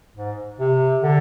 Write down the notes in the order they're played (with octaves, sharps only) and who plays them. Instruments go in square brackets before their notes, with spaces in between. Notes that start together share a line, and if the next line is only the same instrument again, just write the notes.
[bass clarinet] G#2
C3
D3